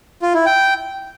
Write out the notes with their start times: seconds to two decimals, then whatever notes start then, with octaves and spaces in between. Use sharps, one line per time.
0.22 F4
0.34 E4
0.46 G5